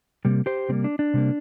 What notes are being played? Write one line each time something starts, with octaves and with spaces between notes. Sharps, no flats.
C3 G3 A#3
G4 C5
C3 G3 A#3 C4
D4
D4
C3 G3 A#3